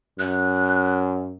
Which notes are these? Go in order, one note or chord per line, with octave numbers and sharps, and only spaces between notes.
F#2 F#6